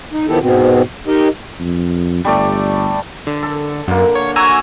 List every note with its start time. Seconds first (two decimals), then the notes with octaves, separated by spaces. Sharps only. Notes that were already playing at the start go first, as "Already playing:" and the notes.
0.12 D#4
0.28 D#3 F3 B3 E4 G4 A4
0.41 G#2 B2 B3 C4
1.07 D#4 G4 A#4 D#5
1.60 F2
2.25 G1 G3 A3 D5
3.27 D3
3.43 A4
3.88 F#2 D3 A#3
4.15 C#5
4.36 F#4 C#5 G#5 A#5 E6